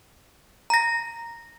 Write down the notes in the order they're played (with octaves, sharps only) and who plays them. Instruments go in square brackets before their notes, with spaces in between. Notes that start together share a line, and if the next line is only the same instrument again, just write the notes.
[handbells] A#5 A#6